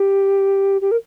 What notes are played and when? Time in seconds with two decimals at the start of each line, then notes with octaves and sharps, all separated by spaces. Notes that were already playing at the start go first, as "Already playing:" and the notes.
Already playing: G4
0.81 G4
0.91 A#4